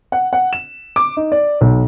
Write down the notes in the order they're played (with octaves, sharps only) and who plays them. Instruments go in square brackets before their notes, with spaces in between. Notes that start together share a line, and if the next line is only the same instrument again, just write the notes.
[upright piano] F#5
F#5
E7
D6
D#4
D5
B1